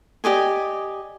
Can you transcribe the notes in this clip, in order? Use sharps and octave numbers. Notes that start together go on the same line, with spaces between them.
G4 D5 D#5 G#5